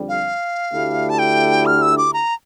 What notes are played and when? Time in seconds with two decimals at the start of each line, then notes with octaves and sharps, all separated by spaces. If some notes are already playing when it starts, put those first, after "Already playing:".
Already playing: F2 D3 G3
0.09 F5
0.72 D2 D3 A3 E4 G4
1.09 A5
1.19 G5
1.66 F6
1.82 E6
1.98 D6
2.13 A#5